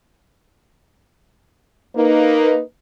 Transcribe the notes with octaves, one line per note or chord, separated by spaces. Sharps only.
A#3 D#4 B4